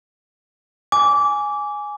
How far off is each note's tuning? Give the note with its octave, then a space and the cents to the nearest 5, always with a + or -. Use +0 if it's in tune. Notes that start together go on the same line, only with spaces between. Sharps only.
G#5 +0 D6 -20